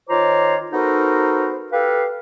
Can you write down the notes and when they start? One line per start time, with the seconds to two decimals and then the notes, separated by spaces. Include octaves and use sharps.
0.09 D#3 F4 C5 C#5 A#5 D6
0.72 B3 D#4 F#4 A4 A#4 C5
1.72 G4 A4 B4 F5